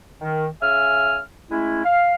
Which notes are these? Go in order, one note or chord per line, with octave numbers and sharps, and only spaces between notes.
D#3
C#3 E5 G#5 F6
G#3 A3 C#4 E4
F5